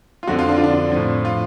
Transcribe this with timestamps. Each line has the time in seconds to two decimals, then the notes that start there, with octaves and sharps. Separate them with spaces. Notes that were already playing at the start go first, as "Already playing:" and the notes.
0.23 F4
0.27 F2 D3 F3 F#4
0.39 F4
0.49 D4
0.57 F4
0.63 D4
0.92 A2 F3
1.25 F4